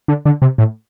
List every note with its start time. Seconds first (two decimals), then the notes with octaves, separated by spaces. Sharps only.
0.08 D3
0.25 D3
0.42 C3
0.58 A2